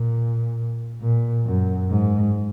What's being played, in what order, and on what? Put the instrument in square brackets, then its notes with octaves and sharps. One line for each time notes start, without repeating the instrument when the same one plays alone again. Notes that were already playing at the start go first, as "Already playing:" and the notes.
Already playing: [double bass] A#2
A#2
F#2
G#2